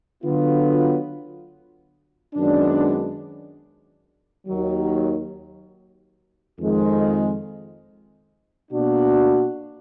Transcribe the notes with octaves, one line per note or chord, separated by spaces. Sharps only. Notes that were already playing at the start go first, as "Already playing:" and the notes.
D3 F#3 B3 F4
F#2 D#3 G#3 B3 D4
D#2 D#3 F#3
F2 D#3 G#3
B2 A#3 D4 F#4